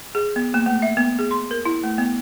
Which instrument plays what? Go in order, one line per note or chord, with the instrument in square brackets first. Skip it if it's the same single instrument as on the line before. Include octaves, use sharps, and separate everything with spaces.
[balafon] G#4
B3
A#3
A3
E5
B3
G#4
C6
A#4
E4
A3
B3